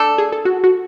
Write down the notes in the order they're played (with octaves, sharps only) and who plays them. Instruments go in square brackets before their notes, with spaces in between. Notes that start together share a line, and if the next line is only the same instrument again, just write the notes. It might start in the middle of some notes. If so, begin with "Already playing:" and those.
Already playing: [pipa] A3 D4 A4
[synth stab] G#4
A4
F#4
F#4